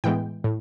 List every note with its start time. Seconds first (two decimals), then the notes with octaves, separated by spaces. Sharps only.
0.04 A2 E3 G#3 B3 G5
0.44 A2